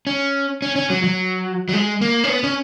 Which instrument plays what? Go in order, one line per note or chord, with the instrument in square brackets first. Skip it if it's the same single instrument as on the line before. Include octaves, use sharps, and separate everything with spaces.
[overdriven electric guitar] C#4
C#4
C#4
F#3
F#3
F#3
G#3
A#3
C#4
B3
C#4